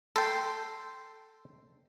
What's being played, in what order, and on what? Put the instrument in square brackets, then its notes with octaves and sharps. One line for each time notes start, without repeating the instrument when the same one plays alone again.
[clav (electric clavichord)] A4 G5 [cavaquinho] C6